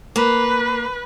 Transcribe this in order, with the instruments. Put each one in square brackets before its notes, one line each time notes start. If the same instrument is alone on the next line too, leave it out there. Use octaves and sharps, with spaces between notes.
[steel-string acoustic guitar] A#3 [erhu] B4